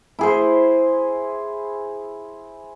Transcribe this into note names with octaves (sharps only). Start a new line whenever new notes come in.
E4 G#4 C5